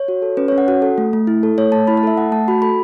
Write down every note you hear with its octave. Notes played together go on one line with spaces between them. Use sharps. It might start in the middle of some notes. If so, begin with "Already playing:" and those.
Already playing: C#5
F#4
A4
C#4 B4
C#4 C#5
F#5
F#4 F#5
A4
A3
A3
E4
A4
A3 C#5
A3 A5
E4 B5
A5
A4 E5
A3 F#5
A3 A5
F#4 B5
A4 B5